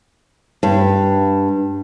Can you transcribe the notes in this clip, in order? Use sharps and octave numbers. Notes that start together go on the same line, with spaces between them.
G2